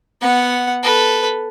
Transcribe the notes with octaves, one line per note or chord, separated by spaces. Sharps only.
B3 F#5
A4 B4